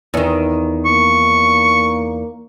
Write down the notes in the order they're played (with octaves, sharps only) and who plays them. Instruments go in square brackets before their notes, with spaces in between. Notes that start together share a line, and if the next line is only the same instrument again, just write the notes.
[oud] E2 D#3
[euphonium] A#3 [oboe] C#6